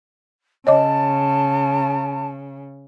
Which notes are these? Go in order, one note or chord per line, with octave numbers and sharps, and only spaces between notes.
C#3 C#5 D#5 A5 D6